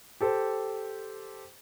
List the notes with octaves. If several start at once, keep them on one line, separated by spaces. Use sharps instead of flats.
G4 A4 C5